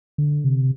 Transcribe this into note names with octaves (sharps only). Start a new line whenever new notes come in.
D3
C3